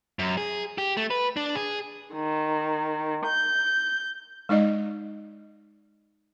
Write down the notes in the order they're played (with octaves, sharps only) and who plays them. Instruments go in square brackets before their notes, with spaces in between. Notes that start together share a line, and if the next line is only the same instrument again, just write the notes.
[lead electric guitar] F#2
G#4
G4
A3
B4
D4
G#4
[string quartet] D#3
G6
[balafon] G#3 D#4 D5 D#5